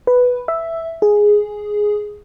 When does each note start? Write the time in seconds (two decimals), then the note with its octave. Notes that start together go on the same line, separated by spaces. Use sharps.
0.07 B4
0.48 E5
1.02 G#4